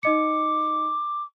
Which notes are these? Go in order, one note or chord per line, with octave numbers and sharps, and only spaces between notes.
D#4 D#5 D6 C#7